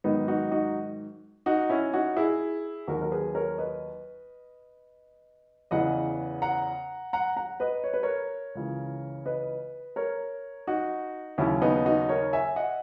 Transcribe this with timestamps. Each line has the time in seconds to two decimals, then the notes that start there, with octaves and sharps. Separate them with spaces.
0.04 G#2 D#3 F#3 B3 D#4
0.28 D#4 F#4
0.51 D#4 F#4
1.46 D#4 F#4
1.70 C#4 E4
1.93 D#4 F#4
2.17 E4 G#4
2.87 D#2 D#3 F#3 F#4 A#4
3.02 A#4
3.11 G#4 B4
3.35 A#4 C#5
3.58 B4 D#5
5.71 E2 C#3 E3 D#5 F#5
6.42 F#5 A#5
7.13 F#5 A#5
7.37 F#5 A#5
7.60 B4 D#5
7.84 C#5
7.93 B4
8.03 A#4 C#5
8.55 C#2 C#3 E3
9.25 B4 D#5
9.96 A#4 C#5
10.67 D#4 F#4
11.38 D#2 C#3 F#3 C#4 E4
11.62 B3 D#4
11.85 D#4 F#4
12.09 A#4 C#5
12.33 E5 G#5
12.56 D#5 F#5